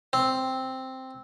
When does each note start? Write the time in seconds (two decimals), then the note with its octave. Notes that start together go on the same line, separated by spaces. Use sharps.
0.13 C4